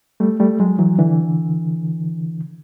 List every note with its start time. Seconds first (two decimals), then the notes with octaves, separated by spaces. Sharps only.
0.20 G3 A3
0.40 G3 A3
0.60 F#3 G#3
0.79 E3 F#3
0.98 D3 E3